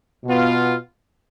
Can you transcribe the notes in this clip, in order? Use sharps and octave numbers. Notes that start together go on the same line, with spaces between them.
B2 B3 F4